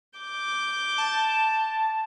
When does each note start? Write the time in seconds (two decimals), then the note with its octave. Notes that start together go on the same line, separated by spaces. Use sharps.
0.18 D6 G6
0.98 A5